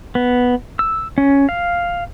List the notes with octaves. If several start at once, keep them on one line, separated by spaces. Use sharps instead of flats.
B3
E6
C#4
F5